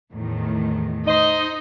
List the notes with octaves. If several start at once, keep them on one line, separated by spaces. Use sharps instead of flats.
E2 A2 D#3
D#4 C5 D#5